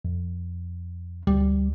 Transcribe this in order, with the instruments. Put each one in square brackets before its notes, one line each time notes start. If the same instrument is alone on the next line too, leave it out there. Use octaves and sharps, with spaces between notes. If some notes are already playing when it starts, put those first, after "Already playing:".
[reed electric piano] F2
[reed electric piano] D2 [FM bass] G3